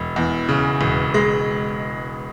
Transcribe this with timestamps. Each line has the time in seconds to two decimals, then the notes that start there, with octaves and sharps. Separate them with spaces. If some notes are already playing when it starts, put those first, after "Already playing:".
Already playing: E1
0.16 E2
0.49 C#3
0.81 E1
1.14 G#3